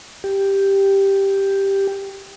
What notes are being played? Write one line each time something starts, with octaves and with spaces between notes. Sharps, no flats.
G4